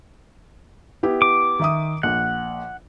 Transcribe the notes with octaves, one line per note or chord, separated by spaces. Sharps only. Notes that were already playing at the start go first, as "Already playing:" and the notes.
B3 E4 G4
D6
D#3 E5 D#6
A#1 F#5